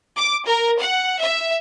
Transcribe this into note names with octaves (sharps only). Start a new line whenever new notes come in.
D6
A#4
F#5
E5